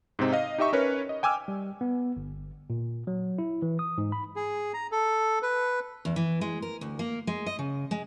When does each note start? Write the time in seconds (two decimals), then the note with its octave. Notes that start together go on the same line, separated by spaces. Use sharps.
0.19 G#2 C3 C4 D#4
0.32 D#5 F5
0.58 D#4 G4 D#5 E5 C#6
0.73 C#4 A#4 B4 C#5
1.09 D#5
1.23 G5 G#5 D6 E6 F6
1.48 G3
1.81 B3
2.17 G1
2.70 A#2
3.07 F#3
3.38 E4
3.62 E3
3.79 D#6
3.98 G#2
4.12 B5
4.36 G#4
4.74 A#5
4.92 A4
5.42 B4
6.05 E2
6.16 E3
6.41 G#3
6.62 A#4
6.81 D2
6.99 A#3
7.27 G#3
7.46 D#5
7.59 C#3
7.91 G#3